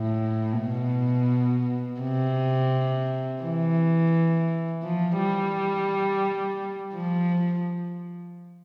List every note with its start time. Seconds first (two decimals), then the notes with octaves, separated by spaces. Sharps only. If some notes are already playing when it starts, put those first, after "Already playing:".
Already playing: A2
0.61 B2
2.01 C3
3.42 E3
4.83 F3
5.18 G3
6.94 F3